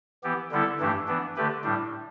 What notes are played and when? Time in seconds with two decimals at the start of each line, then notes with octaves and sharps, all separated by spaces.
0.23 E3 B3 G4
0.51 D3 G3 B3 E4 A4
0.80 G2 E3 A3 D4 G4
1.08 E3 B3 D4
1.36 D3 A3 G4 B4
1.64 A2 G3 D4